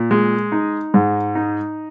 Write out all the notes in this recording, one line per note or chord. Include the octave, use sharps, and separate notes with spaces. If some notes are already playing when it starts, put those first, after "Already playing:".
Already playing: A#2
G#3
D#4
G#2
D#4